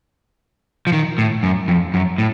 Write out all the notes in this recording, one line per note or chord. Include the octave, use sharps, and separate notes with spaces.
F3
D#3
A2
F#2
F2
F#2
A2